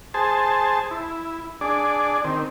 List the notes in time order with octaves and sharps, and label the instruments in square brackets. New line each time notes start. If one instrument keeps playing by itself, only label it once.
[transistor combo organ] G#4 C5 A5
E4
D4 G#4 D5
D#3 C4